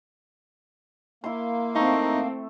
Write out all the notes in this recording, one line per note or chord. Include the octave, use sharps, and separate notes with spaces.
A#3 E4 C6
A3 C4 D#4